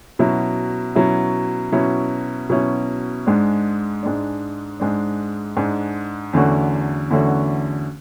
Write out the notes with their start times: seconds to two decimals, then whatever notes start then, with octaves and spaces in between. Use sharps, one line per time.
0.19 B2 F#3 C#4 E4
0.95 B2 F#3 C#4 E4
1.72 B2 F#3 C#4 E4
2.50 B2 F#3 C#4 E4
3.26 G#2 G#3 D4
4.03 G#2 G#3 D4
4.80 G#2 G#3 D4
5.57 G#2 G#3 D4
6.33 E2 D3 A3 C#4 F#4
7.10 E2 D3 A3 C#4 F#4